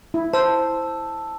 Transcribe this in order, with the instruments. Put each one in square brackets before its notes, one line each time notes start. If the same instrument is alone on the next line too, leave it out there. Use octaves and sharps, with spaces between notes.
[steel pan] E4
[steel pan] C5 [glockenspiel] A5 E6